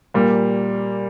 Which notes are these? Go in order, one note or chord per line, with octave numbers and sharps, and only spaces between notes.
A#2 G3 A#3